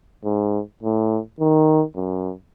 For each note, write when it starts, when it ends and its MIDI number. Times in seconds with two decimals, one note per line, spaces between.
0.25 0.60 44
0.83 1.19 45
1.40 1.83 51
1.96 2.33 42